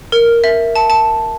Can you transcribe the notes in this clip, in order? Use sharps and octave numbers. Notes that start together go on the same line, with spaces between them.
A#4
E5
A5
A5